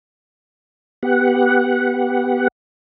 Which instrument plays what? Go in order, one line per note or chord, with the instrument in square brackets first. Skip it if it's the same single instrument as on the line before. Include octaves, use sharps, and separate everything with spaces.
[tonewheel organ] B3 G4 F#5